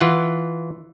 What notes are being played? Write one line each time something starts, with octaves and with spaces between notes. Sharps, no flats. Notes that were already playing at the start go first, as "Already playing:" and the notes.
E3 F4 F#5